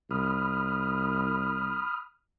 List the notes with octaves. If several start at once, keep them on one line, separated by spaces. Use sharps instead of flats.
C2 B5 D#6 F6